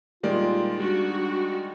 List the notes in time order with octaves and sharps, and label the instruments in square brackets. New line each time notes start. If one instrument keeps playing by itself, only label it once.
[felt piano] A#2 G3 A#3 [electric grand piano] D#3 G#3 D5 [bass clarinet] F4
[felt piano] G3 [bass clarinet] D4 [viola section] F#4